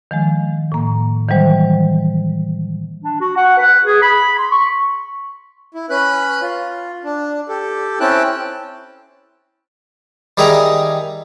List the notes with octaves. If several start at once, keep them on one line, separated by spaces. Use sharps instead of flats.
D#3 F3 G#3
A2 A#3
D#3 E3 F#3 G3 C5
D4
F#4
F#5
B4
G#4
B5
C6
C#6
E4
C#4 B4 B5 F#6
F4
D4
G4 A4
C4 C#4 E4 G5 A5 F#6
D#3 G3 G#4 E5 G5 A#5